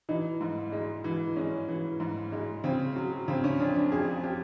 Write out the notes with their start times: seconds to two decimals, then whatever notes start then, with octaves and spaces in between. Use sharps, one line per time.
0.09 E3 D#4
0.41 G#2
0.72 G#3
1.04 E3
1.36 G#3 C#4
1.69 E3
2.00 G#2
2.32 G#3
2.64 C#3 C4
2.96 F#3
3.28 C#3 C4
3.44 C#4
3.59 F2 D4
3.75 D4
3.92 F2 G#4
4.23 G4